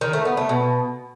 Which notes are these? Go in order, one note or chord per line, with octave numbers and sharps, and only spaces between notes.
D#3
A3
B3
A3
B2